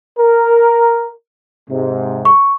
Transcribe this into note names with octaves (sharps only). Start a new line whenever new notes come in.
A#4
G#2 C3
C#6